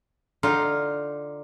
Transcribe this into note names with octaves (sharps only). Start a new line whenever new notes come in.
D3 D#4 F4